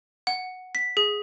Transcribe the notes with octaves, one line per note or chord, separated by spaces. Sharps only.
F#5
B6
G#4